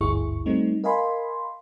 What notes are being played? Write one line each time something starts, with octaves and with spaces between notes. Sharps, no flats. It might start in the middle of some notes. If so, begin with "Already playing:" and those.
G#1 D2 G2 E4 G#4 C#6
G3 A3 C4 D#4
A#4 D#5 F5 G#5 B5 C6